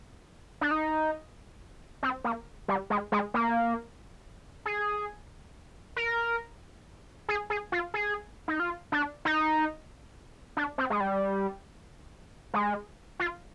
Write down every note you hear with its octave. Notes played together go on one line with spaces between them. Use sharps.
D4
D#4
C4
A#3
G3
G#3
G#3
A#3
G#4
A#4
G#4
G#4
F4
G#4
D#4
F4
D4
D#4
D4
C4
G#3
G3
G#3
F4